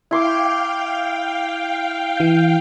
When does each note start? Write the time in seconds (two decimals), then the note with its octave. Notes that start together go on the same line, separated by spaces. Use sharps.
0.11 E4 F5 G5 C6 D6
2.17 E3 G6